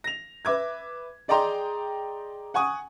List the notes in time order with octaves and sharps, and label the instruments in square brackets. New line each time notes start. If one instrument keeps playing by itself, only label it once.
[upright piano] A#6 F7
B4 E5 D6 G#6
G#4 D5 D#5 G5 A#5 C6
F#5 G#5 C#6 D#6